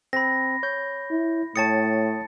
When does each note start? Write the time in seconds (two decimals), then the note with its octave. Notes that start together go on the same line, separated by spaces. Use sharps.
0.13 C4 B5 A#6
0.63 C#5 G6
1.11 E4
1.56 A2 C#5 G5 A5 D#6 A6 C#7